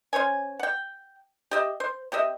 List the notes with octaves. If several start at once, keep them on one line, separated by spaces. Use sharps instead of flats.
C#4 C5 C#5 G#5
F#5 G5
G4 D#5 E5
C5
C3 G4 D#5 E5